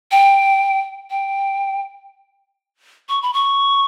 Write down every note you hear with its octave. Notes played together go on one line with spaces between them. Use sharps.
G5
G5
C#6
B5
C#6